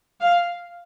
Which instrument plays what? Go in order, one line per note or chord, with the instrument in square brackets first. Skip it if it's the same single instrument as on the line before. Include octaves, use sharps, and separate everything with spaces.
[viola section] F5